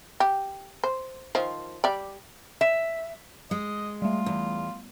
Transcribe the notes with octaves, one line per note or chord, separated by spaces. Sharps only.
G4
C5
D#3 F3 C5
G3 D5
E5
G#3 D#5
G3 A3 F4
E2